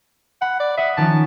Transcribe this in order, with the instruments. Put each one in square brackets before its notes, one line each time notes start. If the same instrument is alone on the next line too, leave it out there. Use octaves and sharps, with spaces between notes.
[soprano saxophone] F#5 [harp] B5
[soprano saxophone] D5
[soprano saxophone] E5 [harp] F#5 D#6
[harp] D#3 F3 C#4 [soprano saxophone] A5